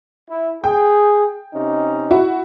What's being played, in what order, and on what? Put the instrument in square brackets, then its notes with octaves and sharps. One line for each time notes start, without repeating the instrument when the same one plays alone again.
[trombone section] E4
[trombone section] G#4 [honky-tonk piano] G5
[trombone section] C3 C#4 D#4
[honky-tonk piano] E4 F#4